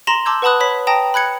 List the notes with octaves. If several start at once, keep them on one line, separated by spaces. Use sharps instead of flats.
A#5 C6 A#6 E7 F#7
A5 C6 D6 E6 G6 G#6
B4 F#5 A5 B5 D#6 F#6
C#5 B5 B6
G5 A5 A#5 D#6 A#6
B5 F#6 G#6 C#7